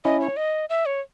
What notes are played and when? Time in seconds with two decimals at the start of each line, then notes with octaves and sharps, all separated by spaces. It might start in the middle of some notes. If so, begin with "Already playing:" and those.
0.05 C#4 E4 D#5
0.21 C#5
0.37 D#5
0.69 E5
0.86 C#5